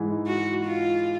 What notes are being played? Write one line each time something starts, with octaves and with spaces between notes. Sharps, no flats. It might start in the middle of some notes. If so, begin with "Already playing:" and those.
Already playing: G#2 E3 G#3
F#4
F4